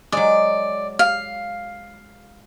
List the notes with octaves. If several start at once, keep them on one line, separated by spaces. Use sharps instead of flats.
F#3 G#3 D5
F5